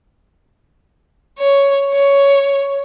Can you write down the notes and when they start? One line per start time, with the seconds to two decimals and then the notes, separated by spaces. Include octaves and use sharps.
1.39 C#5
1.94 C#5